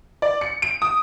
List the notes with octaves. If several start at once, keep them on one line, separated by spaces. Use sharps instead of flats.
D5
C#7
D7
D#6